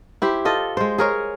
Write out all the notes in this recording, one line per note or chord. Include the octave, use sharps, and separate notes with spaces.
E4 G4 C5
F4 A4 D#5
G#3 C5
G#4 A#4 C#5